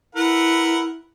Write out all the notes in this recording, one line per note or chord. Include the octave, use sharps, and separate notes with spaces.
E4 A#4 B4 F#5